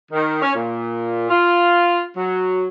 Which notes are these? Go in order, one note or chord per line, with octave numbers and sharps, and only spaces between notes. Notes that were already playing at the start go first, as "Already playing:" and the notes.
D#3
C#4
A#2
F4
F#3